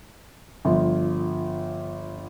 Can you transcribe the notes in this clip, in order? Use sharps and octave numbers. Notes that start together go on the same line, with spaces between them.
G1 F3